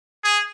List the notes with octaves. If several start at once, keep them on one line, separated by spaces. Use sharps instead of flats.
G#4